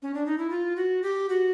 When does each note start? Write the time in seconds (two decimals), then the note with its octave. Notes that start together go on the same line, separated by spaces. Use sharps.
0.02 C#4
0.14 D4
0.26 D#4
0.38 E4
0.50 F4
0.76 F#4
1.03 G4
1.29 F#4